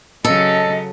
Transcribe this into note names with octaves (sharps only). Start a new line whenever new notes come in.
C#3 F#3 C#4 A4 D#5